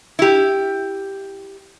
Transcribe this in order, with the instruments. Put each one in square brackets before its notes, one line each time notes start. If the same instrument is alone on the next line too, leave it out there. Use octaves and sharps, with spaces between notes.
[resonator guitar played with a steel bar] E4 G4